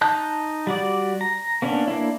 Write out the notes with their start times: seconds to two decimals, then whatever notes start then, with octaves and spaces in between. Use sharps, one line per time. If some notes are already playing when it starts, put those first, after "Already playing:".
0.01 D#4 A5 F#6 G6
0.67 G3 F#4 D5
1.21 A#5
1.62 A#3 B3 C#4 D4
1.88 A#3 D4 E4